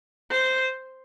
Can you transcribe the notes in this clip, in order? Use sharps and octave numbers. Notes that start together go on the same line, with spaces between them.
C5